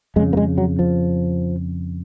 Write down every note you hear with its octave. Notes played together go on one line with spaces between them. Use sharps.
F2 C#3 G#3
A#3
G#3
F#3
F3